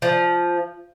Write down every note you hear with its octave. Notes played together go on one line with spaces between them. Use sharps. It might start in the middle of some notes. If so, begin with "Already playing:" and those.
F3